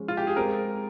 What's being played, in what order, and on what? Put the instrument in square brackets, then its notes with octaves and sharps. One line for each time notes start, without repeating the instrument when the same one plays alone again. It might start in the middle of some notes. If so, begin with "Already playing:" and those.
Already playing: [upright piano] F3 G#3 C#4
[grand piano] F4
G4
G#4
[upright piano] G#3 C4 G4 [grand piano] A#4